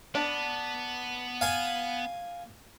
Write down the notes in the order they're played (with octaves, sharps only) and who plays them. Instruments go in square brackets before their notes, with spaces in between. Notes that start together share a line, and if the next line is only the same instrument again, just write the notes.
[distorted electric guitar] B3 [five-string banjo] D4
[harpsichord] F5 G#5